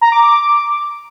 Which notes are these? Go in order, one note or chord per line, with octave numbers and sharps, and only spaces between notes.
A#5
D6
D6